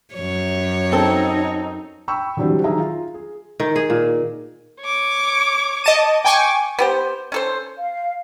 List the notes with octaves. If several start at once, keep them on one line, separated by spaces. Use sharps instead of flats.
F#2 C#5
C4 D#4 A4
G5 B5 C#6 E6
D3 E3 F#3 G3 C4 C5
D#3 F#3 G#4 E5 A#5
F4
G#4
D#3
G#4
A#2
C#5 D6
D#5 A5 D#7
G5 G#5 C#6 D6
B3 G4 C5
C#4 A4 C5
F5